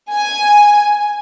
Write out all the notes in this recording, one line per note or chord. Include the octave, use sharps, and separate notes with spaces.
G#5